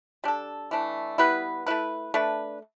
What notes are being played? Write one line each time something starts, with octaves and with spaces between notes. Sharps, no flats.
G3 D4 A4
E3 A3 D4
G3 B3 E4 B4
A3 E4 B4
A3 D4 B4